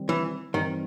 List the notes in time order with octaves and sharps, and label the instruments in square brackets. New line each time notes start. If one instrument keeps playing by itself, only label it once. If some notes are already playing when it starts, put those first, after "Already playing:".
Already playing: [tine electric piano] D#3 G3 C4
[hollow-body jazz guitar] E3
[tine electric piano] G2 E3 G3 C4 D#4 [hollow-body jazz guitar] D#3